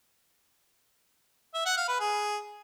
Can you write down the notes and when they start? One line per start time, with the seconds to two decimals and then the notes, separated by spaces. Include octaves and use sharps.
1.54 E5
1.65 F#5
1.77 F5
1.88 B4
2.00 G#4